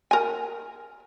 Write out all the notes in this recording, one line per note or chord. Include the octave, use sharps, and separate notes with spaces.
A#4 G#5